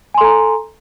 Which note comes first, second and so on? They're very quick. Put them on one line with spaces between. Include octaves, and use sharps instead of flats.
G#5 C6 A4 A#5